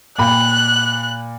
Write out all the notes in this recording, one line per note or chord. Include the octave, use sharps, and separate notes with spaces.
A#2 G5 B5 F#6